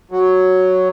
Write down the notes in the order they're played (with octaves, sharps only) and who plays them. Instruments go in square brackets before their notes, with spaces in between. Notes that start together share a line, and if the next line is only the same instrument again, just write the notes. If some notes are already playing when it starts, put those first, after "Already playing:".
[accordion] F#3